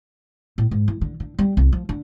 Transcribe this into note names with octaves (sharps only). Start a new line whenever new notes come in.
A2
G#2
E3
D3
D3
G3
C2
F3
D3